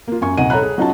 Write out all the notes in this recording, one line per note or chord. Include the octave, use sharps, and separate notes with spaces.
A#3 F4
F#2 G#5 C#6
D#1 C3 D#4 F#5 G#5 D#7
A4 C#5 A#5 B5 F#6
G#4
F#3 C#4 D#4 F4 F#5 A5